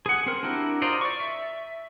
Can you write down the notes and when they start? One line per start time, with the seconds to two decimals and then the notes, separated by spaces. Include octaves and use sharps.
0.06 G#4 F#5
0.26 C4 A#4
0.43 D4 E4 F#4 G4 A#4
0.82 F4 C5 D5 D#5 A#5
1.01 D5 C#6
1.20 E5